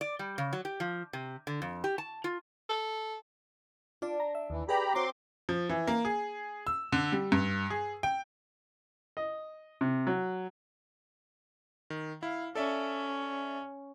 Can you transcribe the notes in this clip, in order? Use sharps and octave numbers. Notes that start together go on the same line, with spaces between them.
D5
G3
C#3
F#3
G4
F3
C3
D3
F2
G4
A5
F4
A4
D4 F4 D5
A#5
E5
D#2 E3
G4 G#4 B4 D5 A#5 B5
C4 F#4 C#5 A#5 C6 D6
F3
E3
A#3
G#4
E6
D3
G3
G2
G#4
G5
D#5
C3
F#3
D#3
E4 F5
C#4 A4 D5 E5